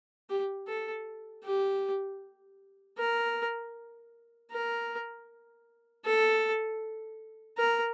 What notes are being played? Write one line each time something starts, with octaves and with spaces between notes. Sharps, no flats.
G4
A4
G4
A#4
A#4
A4
A#4